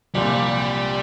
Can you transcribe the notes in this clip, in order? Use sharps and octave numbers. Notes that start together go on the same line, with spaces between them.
C2 A#2 F3 G3